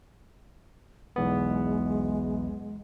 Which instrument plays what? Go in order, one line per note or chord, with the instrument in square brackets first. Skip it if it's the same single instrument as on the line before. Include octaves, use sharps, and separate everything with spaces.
[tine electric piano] B1 E2 B3 [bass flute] G#3